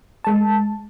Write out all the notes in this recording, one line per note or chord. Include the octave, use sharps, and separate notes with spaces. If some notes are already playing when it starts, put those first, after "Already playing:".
G#3 A5